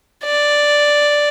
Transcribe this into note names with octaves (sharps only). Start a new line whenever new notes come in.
D5